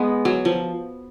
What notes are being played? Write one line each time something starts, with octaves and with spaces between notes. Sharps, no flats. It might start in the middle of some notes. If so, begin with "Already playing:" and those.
Already playing: G#3 B3
F#3
F3